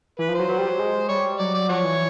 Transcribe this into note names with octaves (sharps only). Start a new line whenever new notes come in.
E3 B4
F3
F#3 C5
F#3
G3
F#3
G#3
G3 C#5
F#3 D5
D5
F3 F#4 C#5
E3